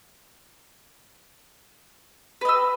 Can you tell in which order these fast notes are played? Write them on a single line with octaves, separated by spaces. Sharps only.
B4 D#5 E6